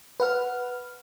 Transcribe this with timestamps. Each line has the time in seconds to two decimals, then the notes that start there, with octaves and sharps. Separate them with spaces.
0.20 B4 F#5 F6